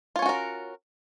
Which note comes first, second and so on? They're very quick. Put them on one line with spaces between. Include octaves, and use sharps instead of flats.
F4 C#5 C#4 F#4 A#4